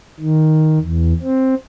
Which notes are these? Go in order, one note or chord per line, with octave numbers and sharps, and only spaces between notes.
D#3
E2
C4